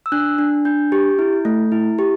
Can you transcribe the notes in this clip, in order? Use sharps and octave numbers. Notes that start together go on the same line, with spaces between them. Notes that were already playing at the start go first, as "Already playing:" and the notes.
E6
D4 F#6
D4
D4 G6
G4
E4
A3
E4
G4